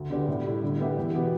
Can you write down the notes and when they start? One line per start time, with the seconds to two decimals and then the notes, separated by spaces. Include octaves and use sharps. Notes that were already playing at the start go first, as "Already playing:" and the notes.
Already playing: D2
0.10 D3 B3 G4 D5
0.28 A2
0.45 G3 E4
0.62 D3
0.79 B3 E4 G4 E5
0.98 E2
1.15 B2 B3 G4